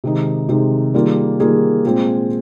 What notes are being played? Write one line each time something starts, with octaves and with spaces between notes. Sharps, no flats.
C3 D#3 G#3 D#4
C3 D#3 G#3 D#4
D#3 G3 A#3 F4 G#4
D#3 G3 A#3 F4 G#4
A#2 G#3 C4 F4 G#4